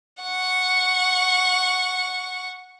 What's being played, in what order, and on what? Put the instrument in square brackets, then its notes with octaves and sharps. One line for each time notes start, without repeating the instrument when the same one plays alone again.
[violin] F#5 C#6